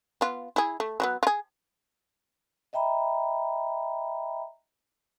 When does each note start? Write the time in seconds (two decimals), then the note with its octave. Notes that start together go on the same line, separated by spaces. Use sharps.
0.21 B3 F4
0.56 E4 G#4
0.80 A3
1.00 F#3 G3 B3
1.23 F4 G#4
2.73 D#5 E5 G5 A#5 B5